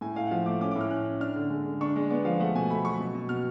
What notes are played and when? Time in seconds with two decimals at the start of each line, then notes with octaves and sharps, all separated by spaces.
0.01 A2 G#5
0.16 A2 F5
0.27 F#5
0.31 F3 F5
0.46 A3 D6
0.61 C#4 D6
0.71 D6
0.76 A2 F6
0.90 C#4 F#6
1.05 C#4
1.20 D4 F6
1.36 D3
1.50 G#3
1.66 D3
1.81 D4 C#6
1.96 G#3
2.10 B3 D5
2.25 F3 F5
2.40 A3 F#5
2.55 B2 G#5
2.70 A3 B5
2.85 F#3 C#6
3.00 B2
3.14 B2
3.29 B2 F6